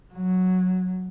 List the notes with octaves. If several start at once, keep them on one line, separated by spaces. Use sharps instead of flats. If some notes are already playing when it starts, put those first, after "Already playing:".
F#3